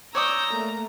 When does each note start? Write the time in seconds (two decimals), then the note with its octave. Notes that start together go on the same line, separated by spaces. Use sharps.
0.15 C#5 D5 A#5 D#6 E6 G6
0.51 A3 A#3